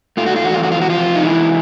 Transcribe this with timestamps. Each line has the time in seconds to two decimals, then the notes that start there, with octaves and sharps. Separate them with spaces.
0.17 A3 F4
0.26 F#4
0.36 F4
0.44 E2 F#4
0.54 F4
0.63 F#4
0.71 E3 F4
0.81 F#4
0.89 F3 F4
0.97 C3
1.15 D#4
1.24 E3 G#3 E4